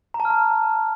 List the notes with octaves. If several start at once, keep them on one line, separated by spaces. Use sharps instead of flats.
A#5
A5
F6
A#5